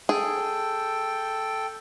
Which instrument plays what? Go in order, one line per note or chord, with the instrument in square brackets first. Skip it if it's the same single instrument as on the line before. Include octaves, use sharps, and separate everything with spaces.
[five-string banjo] G#4 [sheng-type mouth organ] A4 G5